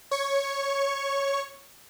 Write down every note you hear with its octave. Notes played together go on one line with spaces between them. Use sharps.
C#5 C#6